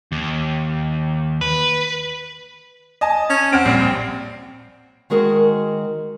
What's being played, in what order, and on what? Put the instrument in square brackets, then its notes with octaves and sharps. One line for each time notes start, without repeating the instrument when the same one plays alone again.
[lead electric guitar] D#2
B4
[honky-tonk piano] D#5 G#5 A5
[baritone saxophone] C#4
[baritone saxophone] C4 [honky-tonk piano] F#5 F6 D7
[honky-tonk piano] A#1 G3 C7
[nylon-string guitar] D#3 G#3 F#4 G#4 A#4 F#5